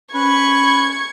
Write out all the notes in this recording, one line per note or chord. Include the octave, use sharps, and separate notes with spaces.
C#4 B4 C#6 G#6